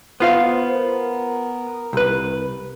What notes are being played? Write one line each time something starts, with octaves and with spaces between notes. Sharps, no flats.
B3 F4 C5 F5
A#4
C2 B4